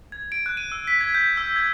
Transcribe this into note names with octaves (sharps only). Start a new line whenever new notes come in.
G#6
D7
F#6
D#7
E6
B6
G#6
G6
E6
G#6